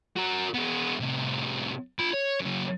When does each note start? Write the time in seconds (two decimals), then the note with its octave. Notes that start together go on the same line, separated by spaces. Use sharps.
0.16 F#4 A#4
0.54 G#3 B3
1.00 A2 C3
1.99 F4 B5
2.13 C#5
2.40 F#2 C#3